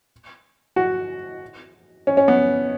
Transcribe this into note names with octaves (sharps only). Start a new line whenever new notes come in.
F#4
C#4
C#4
B3